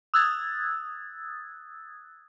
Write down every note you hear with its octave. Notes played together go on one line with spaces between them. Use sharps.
D#6 E6 F#6 G#6 A6